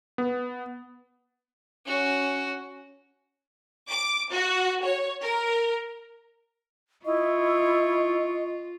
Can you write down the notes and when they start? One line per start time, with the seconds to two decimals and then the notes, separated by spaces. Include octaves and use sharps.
0.18 B3
1.86 C#4 F#4
3.89 D6
4.32 F#4
4.84 C#5
5.22 A#4
7.05 E4 F4 D#5 C#6